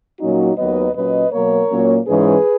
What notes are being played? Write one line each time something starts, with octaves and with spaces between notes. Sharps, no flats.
A#2 F#3 A#3 C#4 D#4 F#4
D#2 D#3 F#3 B3 B4 D#5
A#2 F#3 C#4 B4 D#5
B2 F#3 A#3 A#4 C#5
A#2 F#3 A#3 C#4
G#2 E3 G#3 C#4 G#4 B4